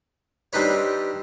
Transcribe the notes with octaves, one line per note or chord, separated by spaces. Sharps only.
G3 C4 D4 D#4 B4 C#5